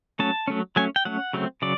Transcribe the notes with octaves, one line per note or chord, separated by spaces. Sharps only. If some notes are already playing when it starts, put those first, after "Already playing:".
F#3 A3 C#4 A5
F#3 A3 C#4
F#3 A3 C#4 G#5
G5
F#3 A3 C#4 F#5
C#3 F#3 A3 C4
C#3 F#3 D5